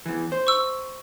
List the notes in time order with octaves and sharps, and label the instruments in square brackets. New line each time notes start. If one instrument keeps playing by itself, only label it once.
[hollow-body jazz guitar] E2 E3
C5
[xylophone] C#6 E6